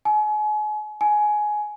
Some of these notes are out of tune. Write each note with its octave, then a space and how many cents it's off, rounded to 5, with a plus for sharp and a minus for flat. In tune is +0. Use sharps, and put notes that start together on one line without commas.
G#5 +35
G#5 +15